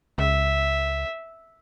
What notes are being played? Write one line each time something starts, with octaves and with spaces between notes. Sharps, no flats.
C#2 E5